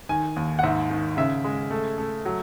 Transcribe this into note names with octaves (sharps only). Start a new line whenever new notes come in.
D#3 G#5
D#2
F#5
G#2 E5
D#3
C#3 E5
G#3
A3
A3
F#3